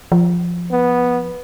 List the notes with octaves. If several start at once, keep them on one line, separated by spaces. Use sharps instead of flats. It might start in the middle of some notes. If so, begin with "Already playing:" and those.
F3
B3